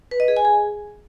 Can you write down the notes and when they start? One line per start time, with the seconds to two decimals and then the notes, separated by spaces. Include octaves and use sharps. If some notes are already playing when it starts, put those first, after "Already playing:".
0.11 B4
0.20 D#5
0.28 G#4
0.37 G#5
0.45 G#4